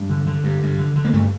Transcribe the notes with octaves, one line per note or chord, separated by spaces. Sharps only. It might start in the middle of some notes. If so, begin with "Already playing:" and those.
Already playing: G2
D3
D3
G2
G2
D3
D3
A#3
G2 A3